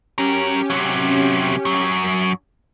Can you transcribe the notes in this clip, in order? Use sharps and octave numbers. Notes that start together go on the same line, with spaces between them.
F#3 C#4 G4 A#4
C3 F#3
F#2 F#3